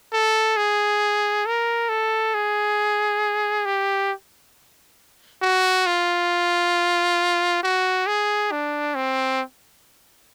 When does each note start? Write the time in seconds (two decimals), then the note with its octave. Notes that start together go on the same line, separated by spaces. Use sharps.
0.13 A4
0.57 G#4
1.46 A#4
1.89 A4
2.34 G#4
3.66 G4
5.42 F#4
5.86 F4
7.63 F#4
8.07 G#4
8.52 D4
8.95 C4